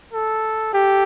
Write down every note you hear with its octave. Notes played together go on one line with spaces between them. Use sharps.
A4
G4 A4